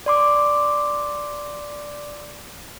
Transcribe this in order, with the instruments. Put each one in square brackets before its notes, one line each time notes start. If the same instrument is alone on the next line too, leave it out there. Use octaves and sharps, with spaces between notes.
[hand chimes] D5 C6 D6